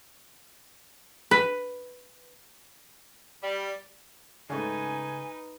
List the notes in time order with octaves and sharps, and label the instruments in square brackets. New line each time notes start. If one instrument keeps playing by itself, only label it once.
[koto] B4
[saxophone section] G3
[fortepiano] G#2 A3 [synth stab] C#3 [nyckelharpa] D#4 B4 [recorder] G#5